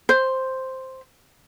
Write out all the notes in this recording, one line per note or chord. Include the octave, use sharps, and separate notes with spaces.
C5